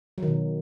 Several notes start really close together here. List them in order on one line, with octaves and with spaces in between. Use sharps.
F#3 D#3 B2